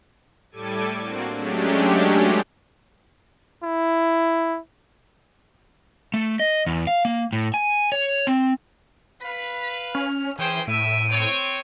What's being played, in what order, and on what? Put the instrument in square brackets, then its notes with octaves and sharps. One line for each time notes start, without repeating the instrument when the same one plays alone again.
[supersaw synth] A2 G3 A4 D6 G#6 D#7
A#3 C4 D4 F#4
F#3 G#3 A3 C#4 D4 G4
[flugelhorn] E4
[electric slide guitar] A3
D#5
E2
F5
A#3
A2
G#5
C#5
C4
[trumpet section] B4 F5 [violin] B6
[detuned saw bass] C#4 [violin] F6
[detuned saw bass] E3 [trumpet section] C#4 C5 G5 [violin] G#4
[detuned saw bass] A2 [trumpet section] E5 [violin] D7 D#7
[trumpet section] C4 C#5